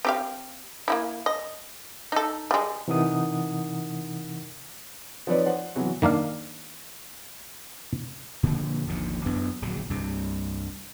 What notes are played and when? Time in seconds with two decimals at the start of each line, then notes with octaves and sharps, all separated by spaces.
0.05 C4 G4 F5
0.88 A#3 D#4 E4
1.26 D#5
2.12 D#4 A4
2.51 G3 G#3
2.88 C3 E3 D#4 A#4 F#5 D#6
5.27 F3 C4 D#4 B4 C#5 D5
5.46 C5 F#5
5.75 C3 E3 F#3 B3 F#4
6.02 D#3 A#3 D4 F5
8.43 A#2 D3 F3 A#3
8.87 G#1 D#2 D3 F3
9.25 A1 F#2 B3 D4
9.62 D1 A#1 C#3 F#3
9.90 C2 G2 C3